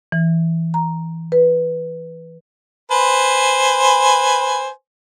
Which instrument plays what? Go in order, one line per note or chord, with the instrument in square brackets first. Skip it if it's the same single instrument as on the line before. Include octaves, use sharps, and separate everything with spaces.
[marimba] E3
A#5
B4
[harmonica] B4 C5 G#5